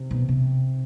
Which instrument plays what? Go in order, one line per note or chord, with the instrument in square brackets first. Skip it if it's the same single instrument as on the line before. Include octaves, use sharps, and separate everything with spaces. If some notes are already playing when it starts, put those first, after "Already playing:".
Already playing: [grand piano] C3
[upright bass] B2
C3